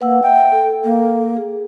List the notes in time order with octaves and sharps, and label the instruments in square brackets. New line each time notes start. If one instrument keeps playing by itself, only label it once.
[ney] A#3 [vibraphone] B4 F#5 E6
[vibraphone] E5 F#5 [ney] G5
[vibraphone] A4
[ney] A#3
[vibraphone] G#4